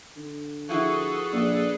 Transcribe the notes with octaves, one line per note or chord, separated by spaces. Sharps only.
D3
F3 E4 F#4 G#4 A4 B4 C#6
A#1 D5